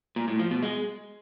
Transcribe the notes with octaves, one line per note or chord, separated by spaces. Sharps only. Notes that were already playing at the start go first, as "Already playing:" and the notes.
A#2
A2
F3
B2
G#3